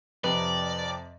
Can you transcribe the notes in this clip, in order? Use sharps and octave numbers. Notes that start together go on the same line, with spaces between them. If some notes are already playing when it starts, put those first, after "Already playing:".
F2 C3 B4 D5